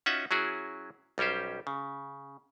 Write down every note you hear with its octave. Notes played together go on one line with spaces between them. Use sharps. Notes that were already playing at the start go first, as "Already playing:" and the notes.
C#4 D#4 F4 F#4 E5 F#5
F#3 C#4 E4 F#4 G#4
B1 G3 C#4 G4 C5
C#3